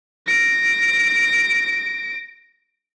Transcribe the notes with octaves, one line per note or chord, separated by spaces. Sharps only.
A#6 D7